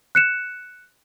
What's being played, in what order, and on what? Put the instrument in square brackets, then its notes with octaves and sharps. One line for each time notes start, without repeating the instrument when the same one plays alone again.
[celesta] F#6 C#7 E7